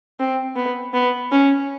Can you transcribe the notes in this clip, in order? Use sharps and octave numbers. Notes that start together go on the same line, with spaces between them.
C4
B3
B3
C#4